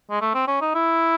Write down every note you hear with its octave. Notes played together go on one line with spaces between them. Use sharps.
G#3
A3
C4
C#4
D#4
E4